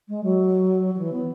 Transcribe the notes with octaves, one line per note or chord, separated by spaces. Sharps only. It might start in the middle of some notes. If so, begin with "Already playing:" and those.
G#3
F#3
F#3
E3
B3